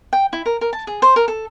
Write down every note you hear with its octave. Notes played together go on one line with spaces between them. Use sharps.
G5
E4
A#4
A#4
A5
G#4
C5
A#4
A4